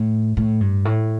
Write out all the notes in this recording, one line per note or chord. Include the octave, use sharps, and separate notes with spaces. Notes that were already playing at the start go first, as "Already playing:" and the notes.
Already playing: A2
A2
G2
A2